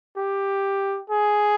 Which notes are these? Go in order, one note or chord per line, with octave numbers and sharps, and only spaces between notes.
G4
G#4